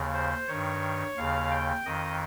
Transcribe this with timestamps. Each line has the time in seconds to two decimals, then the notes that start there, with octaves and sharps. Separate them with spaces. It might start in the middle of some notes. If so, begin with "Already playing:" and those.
Already playing: D#2 C#3
0.13 C5
0.47 G2 D#3 C#5
1.17 D#2 C#3 F5
1.51 G5
1.86 F2 D#3 D#5